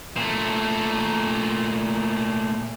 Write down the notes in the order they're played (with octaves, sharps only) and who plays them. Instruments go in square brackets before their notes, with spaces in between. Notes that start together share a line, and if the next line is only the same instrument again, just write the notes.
[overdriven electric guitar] A#2 A3